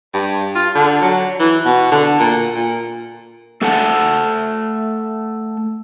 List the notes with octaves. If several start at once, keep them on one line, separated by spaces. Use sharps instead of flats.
G2
F4
D3
F#3
E3
B2
D3
A#2
A#2
A3 A4 F#5 A5